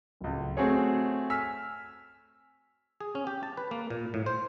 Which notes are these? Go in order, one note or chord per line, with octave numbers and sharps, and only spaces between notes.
D1 C#2
A3 C4 F#4 G#4 C#5
G#5 E6 F6 B6
G#4
C#4
G4
A5
B4
A#3
A#2
A2
C5